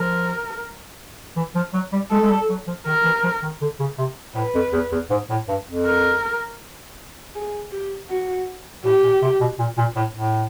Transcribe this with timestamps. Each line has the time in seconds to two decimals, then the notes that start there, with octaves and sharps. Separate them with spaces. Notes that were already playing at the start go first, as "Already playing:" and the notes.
Already playing: F3 A#4
1.36 E3
1.55 F3
1.73 F#3
1.93 G3
2.11 G#3 A4
2.22 G#3
2.30 G3
2.49 F#3
2.67 F3
2.86 D#3 A#4
3.04 E3
3.23 F3
3.42 D#3
3.61 D3
3.80 C#3
3.98 C3
4.35 A2 B4
4.55 F2
4.72 E2
4.92 E2
5.10 G#2
5.30 A2
5.48 G2
5.67 F2
5.86 A#4
7.35 G#4
7.72 G4
8.10 F#4
8.85 A2 G4
9.03 A#2
9.22 C3
9.40 B2
9.59 A#2
9.78 A#2
9.96 A2
10.14 A2